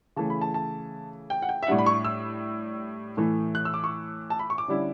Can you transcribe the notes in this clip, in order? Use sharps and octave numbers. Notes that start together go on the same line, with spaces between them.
C#3 E3 A3 A5
B5
A5
A5
G5
F#5
G5
E5
A2 G3 D4 F#5
B5
C#6
E6
A2 E3 A3
F#6
E6
D6
C#6
A5
B5
C#6
D6
D3 G3 C#4 E4